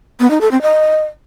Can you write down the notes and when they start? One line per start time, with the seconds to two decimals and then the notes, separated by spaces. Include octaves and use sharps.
0.20 B3
0.30 D#4
0.41 A4
0.51 C4
0.62 D#5